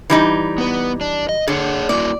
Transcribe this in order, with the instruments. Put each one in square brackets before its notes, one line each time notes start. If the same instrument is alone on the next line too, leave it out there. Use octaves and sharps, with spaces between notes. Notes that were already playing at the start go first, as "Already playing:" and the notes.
[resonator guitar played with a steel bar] E3 G3 D#4
[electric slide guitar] B3 B4
D4
D#5
[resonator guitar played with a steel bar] D3 [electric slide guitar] G#4 C#5 F#5
[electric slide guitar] A#3 E4 F#4 [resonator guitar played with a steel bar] D5